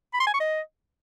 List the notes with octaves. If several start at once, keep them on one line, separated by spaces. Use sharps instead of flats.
B5
C6
G#5
C#6
D#5